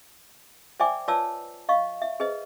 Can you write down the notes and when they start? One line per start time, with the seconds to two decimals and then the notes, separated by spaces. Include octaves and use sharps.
0.80 C5 D5 E5 G5 G#5 D6
1.08 F4 B4 C#5 D5 A5 E6
1.69 D#5 F5 C#6
2.02 E5
2.20 G#4 B4 C5 D#5